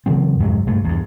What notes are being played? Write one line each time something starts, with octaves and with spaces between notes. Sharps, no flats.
C#3 E3 F#3 C4
F2 G#2 C3 F#3
A#1 G2 A3
E2 G2